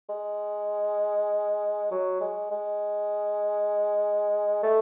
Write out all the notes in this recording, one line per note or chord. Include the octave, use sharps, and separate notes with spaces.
G#3
F#3
G#3
G#3
A3